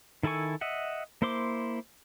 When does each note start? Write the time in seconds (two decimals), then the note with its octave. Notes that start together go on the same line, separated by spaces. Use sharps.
0.23 D#3 E4 A4 G#5 C#6
0.61 D#5 E5 F#5
1.22 A#3 E4 C5 C6 D6